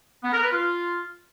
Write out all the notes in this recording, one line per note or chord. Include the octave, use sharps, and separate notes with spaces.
B3
A#4
B4
F4